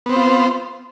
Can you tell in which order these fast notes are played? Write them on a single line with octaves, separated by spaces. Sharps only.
B3 C4 C5 F4